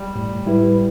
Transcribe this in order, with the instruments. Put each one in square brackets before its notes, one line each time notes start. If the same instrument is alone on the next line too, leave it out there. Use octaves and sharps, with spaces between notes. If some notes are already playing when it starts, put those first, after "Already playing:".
Already playing: [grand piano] G3
[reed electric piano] A2
G3 E4 B4